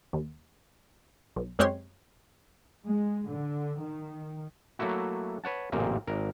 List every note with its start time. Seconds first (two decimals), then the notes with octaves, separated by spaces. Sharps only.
0.13 D#2
1.36 B1
1.59 F#2 G#3 C4 G4 C#5 C6
2.84 G#3
3.28 D3
3.80 D#3
4.79 F#3 A3 A#3 E4 F#4
5.44 B4 C#5 F#5 A5
5.72 A1 F#2 A#2 C#3 C4 A#4
6.07 G#1 A#4